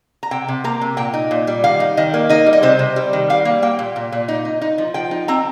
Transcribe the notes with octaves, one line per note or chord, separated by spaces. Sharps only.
A#5
C3 G5
C3
A#3 A#5
C3
A#2 G5
D#4
A#2
G3
D#3 F5
D#4
D#3 D#5
A#3
D#4 D#5
G3
D#5
C3 C5
C3
G3
D#3
G3 F5
A#3
A#3 G5
A#2
A#2
A#2
D#4
D#4
D#4
F3
F3 G5
D#4
C4 A#5